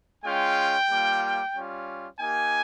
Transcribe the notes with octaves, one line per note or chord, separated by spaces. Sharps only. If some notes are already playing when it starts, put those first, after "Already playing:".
G#3 C#4 F4 G5
G3 A#3 F4
G3 C#4 F4
A#3 D#4 G4 G#5